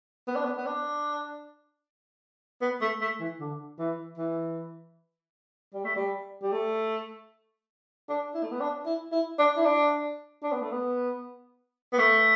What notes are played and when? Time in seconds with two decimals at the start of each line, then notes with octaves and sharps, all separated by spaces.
0.28 B3
0.36 D4
0.45 B3
0.57 B3
0.66 D4
2.62 B3
2.81 A3
3.01 A3
3.20 E3
3.40 D3
3.79 E3
4.18 E3
5.74 G3
5.85 A3
5.96 G3
6.42 G3
6.52 A3
8.09 D4
8.35 E4
8.43 A3
8.51 B3
8.61 D4
8.86 E4
9.12 E4
9.39 D4
9.57 E4
9.65 D4
10.43 D4
10.52 B3
10.62 A3
10.71 B3
11.93 B3
11.99 A3